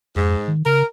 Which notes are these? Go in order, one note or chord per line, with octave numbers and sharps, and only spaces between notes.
F2 G#2
D#3
C#3 A#4